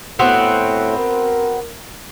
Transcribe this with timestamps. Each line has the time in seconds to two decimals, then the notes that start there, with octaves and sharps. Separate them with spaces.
0.19 A2 B3 C4 F#4
0.98 A#4